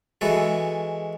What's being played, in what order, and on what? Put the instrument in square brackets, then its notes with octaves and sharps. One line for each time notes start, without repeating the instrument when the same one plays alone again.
[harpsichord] E3 G#3 F#4 A4